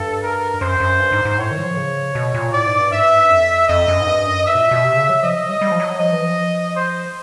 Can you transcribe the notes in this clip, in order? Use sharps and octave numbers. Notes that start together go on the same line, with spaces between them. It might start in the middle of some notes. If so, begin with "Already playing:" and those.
Already playing: G2 A4
A#4
F#2 C5
F#2
G2
G#2
G#2
A2 C#5
D#3
F#3
F3
C#3
B2
A#2
A2 D5
G#2
G2
G#2 E5
G2
F2
F2 D#5
F#2
G#2
G2
F#2
G2 E5
B2
A#2
B2
C3
C#3
F#3
F3 D#5
F#3
G3
G3
F3
F#3
F3 D#5
E3
F3
C5